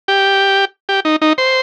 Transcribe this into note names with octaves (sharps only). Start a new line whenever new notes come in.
G4
G4
D#4
D#4
C5